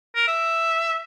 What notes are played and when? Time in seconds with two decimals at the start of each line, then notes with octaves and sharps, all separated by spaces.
0.15 A#4
0.28 E5